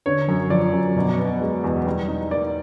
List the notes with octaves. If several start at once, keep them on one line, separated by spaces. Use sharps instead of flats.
D3 C#5
F#2
F3 D5
F#2
B2
B3
G#3
E2
G3
D#4
A#3 D5